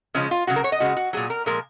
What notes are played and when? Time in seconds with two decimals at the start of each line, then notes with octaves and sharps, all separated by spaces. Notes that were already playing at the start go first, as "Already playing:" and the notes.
0.14 C#3 F3 G#3 C#4
0.31 F4
0.47 C#3 F#3 F#4
0.56 A#4
0.64 C#5
0.72 D#5
0.80 C#3 G#3 F#4
0.97 F#4
1.13 A#2 F#3 G#4
1.30 A#4
1.46 A#2 F3 G#3 A#4